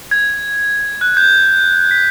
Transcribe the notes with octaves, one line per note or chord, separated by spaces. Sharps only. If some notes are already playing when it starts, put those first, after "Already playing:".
G#6
F#6
G6
B6